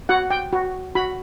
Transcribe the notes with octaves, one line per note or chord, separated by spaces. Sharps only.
F#4 F#5
G5
F#4
F#4 B5